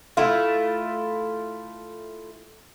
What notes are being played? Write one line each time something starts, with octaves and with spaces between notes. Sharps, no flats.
A3 E4 F4